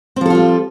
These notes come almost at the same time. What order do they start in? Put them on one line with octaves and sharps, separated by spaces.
C4 F3 A4 F4 G3